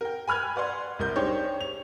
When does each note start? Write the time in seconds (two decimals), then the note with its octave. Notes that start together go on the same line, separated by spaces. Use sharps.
0.01 A#4 G5
0.27 G#5 B5 F6 F#6 G#6
0.56 B4 D5 F#5 C6
0.99 C2 A#4 G6
1.16 D4 D#4 G4 G#4 C5 C#5
1.61 F7